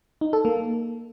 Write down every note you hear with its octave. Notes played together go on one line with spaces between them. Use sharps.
D#4
A4
A#3